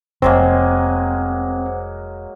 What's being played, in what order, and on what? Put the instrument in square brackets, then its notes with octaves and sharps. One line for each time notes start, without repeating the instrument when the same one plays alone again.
[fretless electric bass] F1 [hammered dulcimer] F#3 G#3 A#3 [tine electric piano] C4 [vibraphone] C5 F#5